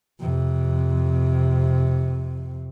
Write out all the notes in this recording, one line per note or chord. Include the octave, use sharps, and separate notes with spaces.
F2 C3